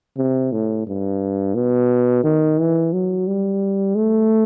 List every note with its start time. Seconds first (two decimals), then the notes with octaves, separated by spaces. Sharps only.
0.17 C3
0.52 A2
0.87 G2
1.55 B2
2.24 D#3
2.59 E3
2.93 F#3
3.28 G3
3.96 A3